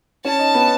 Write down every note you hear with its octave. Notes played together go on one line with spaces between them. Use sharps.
C#4 C#5 A5
D#4 D#5
B3 B4